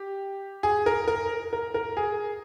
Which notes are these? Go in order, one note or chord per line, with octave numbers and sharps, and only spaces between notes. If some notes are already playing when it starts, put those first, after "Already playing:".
Already playing: G4
G#4
A#4
A#4
A#4
A#4
G#4